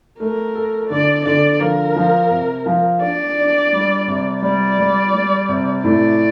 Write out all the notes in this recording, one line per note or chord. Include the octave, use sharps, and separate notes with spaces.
A3 A#4
A4
D3 D5
D3 D5
F3 A#4
F3
C3
F3
D4 D5
D4
G3
C3
G3 D5
G3
G3
C3
A2 D5